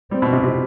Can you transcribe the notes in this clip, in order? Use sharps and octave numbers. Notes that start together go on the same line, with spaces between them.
G3 C4
B2
C3
C3